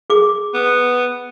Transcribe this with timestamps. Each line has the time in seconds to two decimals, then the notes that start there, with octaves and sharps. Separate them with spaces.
0.10 G#4 D6
0.54 B3